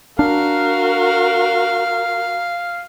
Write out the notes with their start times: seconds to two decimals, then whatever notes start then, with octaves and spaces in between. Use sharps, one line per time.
0.19 D4 F#4 A#4 F5